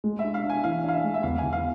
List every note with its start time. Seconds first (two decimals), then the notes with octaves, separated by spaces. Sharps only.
0.04 G#3
0.19 E5
0.24 D4
0.34 F5
0.44 D4
0.50 G#5
0.64 E3 F5
0.84 D4 F5
0.93 E5
1.04 G#3
1.14 E5
1.23 E2 F5
1.38 E2 G#5
1.53 F5